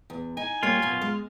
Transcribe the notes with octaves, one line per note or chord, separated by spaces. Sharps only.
E2
D#4 G#5
G3 A#3 F4 C#5
F#2 B2
G#3